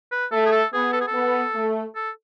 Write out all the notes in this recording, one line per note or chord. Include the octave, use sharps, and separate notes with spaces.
B4
A3 A4
G#4
A4
B3 G#4
A4
G#4
A4
B3
A3
A4